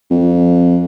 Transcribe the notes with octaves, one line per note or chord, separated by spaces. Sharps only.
F2